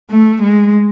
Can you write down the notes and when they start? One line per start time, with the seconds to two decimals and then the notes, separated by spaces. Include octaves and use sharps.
0.11 A3
0.43 G#3